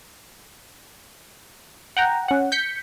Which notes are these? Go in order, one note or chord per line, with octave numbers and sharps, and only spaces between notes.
F#5 G5 A#5
C#4 F#5
G6 B6 C#7